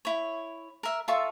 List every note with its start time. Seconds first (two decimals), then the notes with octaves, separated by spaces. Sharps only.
0.05 E4 C#5
0.83 A#4 E5
1.08 F4 A4 E5 C#6